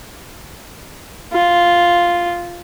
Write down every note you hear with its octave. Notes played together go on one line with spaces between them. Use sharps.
F4